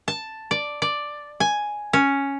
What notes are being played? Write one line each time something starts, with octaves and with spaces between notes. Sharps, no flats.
A5
D5
D5
G#5
C#4